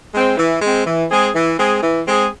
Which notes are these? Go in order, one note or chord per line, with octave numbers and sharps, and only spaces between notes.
G#3 C4
E3
G#3 C4
E3
G#3 C4 G#4
E3
G#3 C4 G#4
E3
G#3 C4 G#4